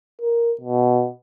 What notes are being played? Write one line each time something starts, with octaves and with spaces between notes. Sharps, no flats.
A#4
B2